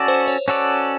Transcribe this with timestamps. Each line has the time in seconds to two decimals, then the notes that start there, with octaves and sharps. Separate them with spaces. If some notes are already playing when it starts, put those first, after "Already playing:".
Already playing: C#4 F#4 A4 D5
0.08 C5
0.28 C#5
0.48 C#4 F#4 A4 C#5 D5